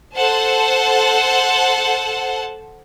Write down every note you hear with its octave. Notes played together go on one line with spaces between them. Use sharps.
A4 C5 F#5 A5